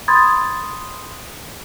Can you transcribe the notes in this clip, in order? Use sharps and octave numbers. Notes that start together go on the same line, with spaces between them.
B5 C6 D#6 G#6 A6